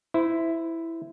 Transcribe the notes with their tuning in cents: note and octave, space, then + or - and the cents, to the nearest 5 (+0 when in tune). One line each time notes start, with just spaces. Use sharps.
E4 +0 C5 -25